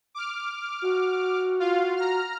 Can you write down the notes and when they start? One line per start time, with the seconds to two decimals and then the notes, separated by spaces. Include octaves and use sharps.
0.15 D6 F6
0.82 F#4
1.60 F4 F5
1.96 A#5 F6